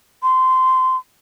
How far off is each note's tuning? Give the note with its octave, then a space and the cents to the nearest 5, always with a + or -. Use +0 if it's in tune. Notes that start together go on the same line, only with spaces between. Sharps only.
C6 -20